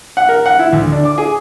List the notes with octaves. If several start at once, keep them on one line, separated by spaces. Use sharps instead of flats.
F#5
A#4
F#5
E4
D2
D4
D6
G#4